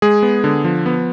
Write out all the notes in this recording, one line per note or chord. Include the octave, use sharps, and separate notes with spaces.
G#3 G#4
B3
D3
F3
B3